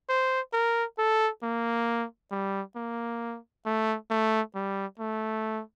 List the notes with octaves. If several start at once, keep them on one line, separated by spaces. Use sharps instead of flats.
C5
A#4
A4
A#3
G3
A#3
A3
A3
G3
A3